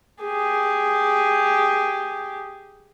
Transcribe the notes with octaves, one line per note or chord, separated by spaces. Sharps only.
G4 G#4